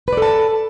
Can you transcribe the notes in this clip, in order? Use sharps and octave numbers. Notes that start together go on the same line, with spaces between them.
A4 B4 D5 A5